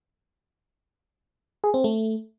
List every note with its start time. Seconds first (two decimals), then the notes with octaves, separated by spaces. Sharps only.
1.64 G#4
1.74 C4
1.84 A3